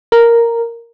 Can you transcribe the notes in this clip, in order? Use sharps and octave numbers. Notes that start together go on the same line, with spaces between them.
A#4